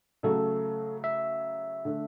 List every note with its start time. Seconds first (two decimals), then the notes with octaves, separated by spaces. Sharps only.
0.23 C#3 F#3 A3 A4
1.04 E5
1.85 D3 A3 D4